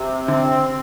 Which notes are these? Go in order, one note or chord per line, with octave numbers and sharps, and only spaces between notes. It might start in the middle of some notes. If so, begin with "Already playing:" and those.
Already playing: C3
D3 C4